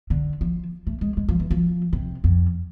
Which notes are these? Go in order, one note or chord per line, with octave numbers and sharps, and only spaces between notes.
D3
F3
A3
G#3
G#3
F3
E3
F3
C3
F2